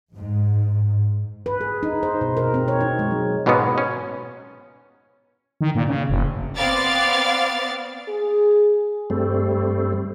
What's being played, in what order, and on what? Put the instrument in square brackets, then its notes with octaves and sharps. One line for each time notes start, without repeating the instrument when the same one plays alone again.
[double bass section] G#2
[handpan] B4
G#4
D#4
C5
B2
A#4
C4
C#5
D#4
G#3
F#3
[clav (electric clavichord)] G#2 B2 G#3 A#3 B3 C#4
C#4
[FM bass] D#3
A#2
C#3
F#1
[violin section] B3 C4 D5 F5 A6
[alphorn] G#4
[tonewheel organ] G2 G3 A3 C4